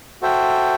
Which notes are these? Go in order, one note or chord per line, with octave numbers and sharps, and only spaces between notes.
F#4 A4 C5 E5 G5